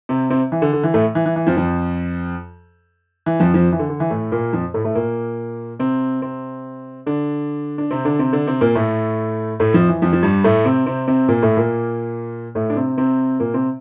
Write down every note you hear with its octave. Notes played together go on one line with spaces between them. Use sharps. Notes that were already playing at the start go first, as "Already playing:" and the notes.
C3 C4
C3 C4
E3
D3
D3
E3
A2 A3
E3
E3
E3
F2 F3
F2 F3
E3
F2 F3
F2 F3
E3
D3
D3
E3
A2 A3
A#2 A#3
F2 F3
A2 A3
A2 A3
A#2 A#3
C3 C4
C3 C4
D3 D4
D4
C3 C4
D3 D4
C3 C4
D3 D4
C3 C4
A#2 A#3
A2 A3
A2 A3
F2 F3
E3
F2 F3
F3
G2 G3
A2 A3
C3 C4
C3 C4
C3 C4
A#2 A#3
A2 A3
A#2 A#3
A2 A3
D4
C3 C4
C3 C4
A#2 A#3
C3 C4